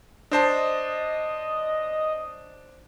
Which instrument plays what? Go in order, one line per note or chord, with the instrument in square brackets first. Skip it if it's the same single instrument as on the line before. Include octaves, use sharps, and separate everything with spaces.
[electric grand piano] D4 C5 A5 [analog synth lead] D#5